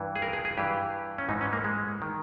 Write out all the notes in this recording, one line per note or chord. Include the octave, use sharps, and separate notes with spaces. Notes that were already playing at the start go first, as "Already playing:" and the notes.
Already playing: G2 E3
G#4
A#4
G#4
G#4
G2 E3 G4
C#4
G#2 E3 D#4
C#4
A#3
G#3
D#3